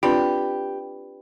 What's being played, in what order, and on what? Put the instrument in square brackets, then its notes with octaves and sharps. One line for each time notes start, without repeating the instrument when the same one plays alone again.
[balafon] C4 D4 F4 [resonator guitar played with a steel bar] G4 [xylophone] B4 D5 B5